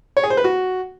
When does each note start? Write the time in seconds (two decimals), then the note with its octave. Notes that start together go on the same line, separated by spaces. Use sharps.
0.17 C#5
0.23 G#4
0.30 C5
0.37 B4
0.44 F#4